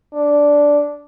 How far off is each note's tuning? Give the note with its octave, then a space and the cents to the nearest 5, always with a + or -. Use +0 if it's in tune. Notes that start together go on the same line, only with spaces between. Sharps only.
D4 -10